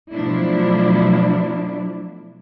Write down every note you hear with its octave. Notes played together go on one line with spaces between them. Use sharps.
B2 F3 F#3 A3 D4 E4